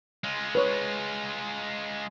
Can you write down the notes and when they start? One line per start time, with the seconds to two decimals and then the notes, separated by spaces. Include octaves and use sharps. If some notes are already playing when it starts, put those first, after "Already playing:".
0.24 G#3 F4
0.55 B4 C#5